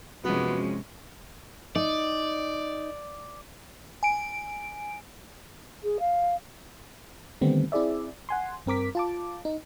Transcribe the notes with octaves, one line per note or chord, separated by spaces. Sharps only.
F#2 C3 F3 G#3 B3 C#4 F#4
D#4 D5
G#5 D7
G#4
F5
D3 D#3 G3 A3 B3 C4
C4 E4 G#4 D5 E5
F#5 G#5 C6
G2 C4 A#4 D6 B6
F4 A5 D6
D#4